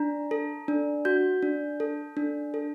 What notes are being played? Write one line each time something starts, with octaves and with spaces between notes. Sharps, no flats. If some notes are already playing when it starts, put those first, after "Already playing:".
Already playing: D4 A#5
A4
D4
F#4 G6
D4
A4
D4
A4